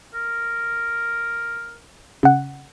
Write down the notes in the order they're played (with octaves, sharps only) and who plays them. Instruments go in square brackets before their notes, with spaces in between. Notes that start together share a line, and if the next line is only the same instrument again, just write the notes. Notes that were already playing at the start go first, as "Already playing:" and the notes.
[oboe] A#4
[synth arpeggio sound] C#3 F#5